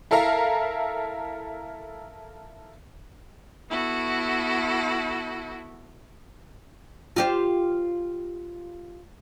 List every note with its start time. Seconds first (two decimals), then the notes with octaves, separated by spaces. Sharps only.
0.11 E4 A4 A#4 E5 F5 A#5
3.69 B3 E4 F#4 A4
7.16 F4 G4 C5